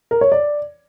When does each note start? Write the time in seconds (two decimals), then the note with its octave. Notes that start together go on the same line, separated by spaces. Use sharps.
0.11 A#4
0.21 C#5
0.32 D5